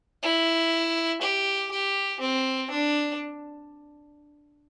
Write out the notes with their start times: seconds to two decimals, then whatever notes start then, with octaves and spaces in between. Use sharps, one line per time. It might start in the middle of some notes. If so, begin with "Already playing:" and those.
0.23 E4
1.22 G4
1.71 G4
2.20 C4
2.70 D4